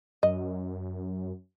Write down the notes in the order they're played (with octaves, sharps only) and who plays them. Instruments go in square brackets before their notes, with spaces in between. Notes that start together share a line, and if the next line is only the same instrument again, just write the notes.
[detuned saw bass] F#2 [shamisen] D#5